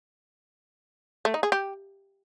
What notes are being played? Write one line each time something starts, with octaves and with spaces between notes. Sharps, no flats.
A3
D#4
G#4
G4